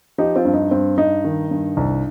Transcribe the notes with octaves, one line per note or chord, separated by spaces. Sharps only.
F3 D#4 G4
C4 F4
G2
D#4
G2 C4
G2 D#4
D#3
G2
C2